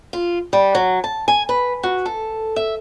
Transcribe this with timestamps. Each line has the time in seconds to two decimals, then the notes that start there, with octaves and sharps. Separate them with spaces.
0.13 F4
0.53 G3
0.75 F#3
1.04 A5
1.28 G#5
1.49 B4
1.83 F#4
2.06 A4
2.56 E5